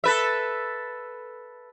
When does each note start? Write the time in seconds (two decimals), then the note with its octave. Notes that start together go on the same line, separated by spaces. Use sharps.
0.04 A4 B4 E5